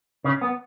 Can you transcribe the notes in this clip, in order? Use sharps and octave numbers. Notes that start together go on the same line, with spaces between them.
C#3
B3